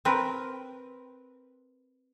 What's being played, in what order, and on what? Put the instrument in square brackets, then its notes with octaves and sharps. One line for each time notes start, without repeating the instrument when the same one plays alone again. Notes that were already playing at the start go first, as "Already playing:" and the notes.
[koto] C4 A#4 B4